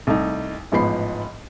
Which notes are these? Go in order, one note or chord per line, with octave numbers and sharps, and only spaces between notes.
C2 A3 D#4
A1 G#2 F3 B3 B5 C7